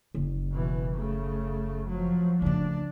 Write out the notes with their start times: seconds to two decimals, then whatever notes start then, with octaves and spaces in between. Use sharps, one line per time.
0.15 F#1
0.51 B2 E3
0.96 C#3 A3
1.88 F3 F#3
2.42 C#3 A3 D4